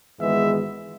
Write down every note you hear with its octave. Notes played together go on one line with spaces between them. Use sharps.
G#1 G#2 E3 G#3 B3 E5